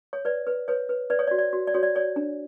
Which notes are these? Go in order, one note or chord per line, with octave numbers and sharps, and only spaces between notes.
C#5
B4 D5
B4
B4 C#5
B4
B4 D5
C#5
D5
F#4
D5
F#4
D5
F#4 C#5
D5
C#5 D5
D4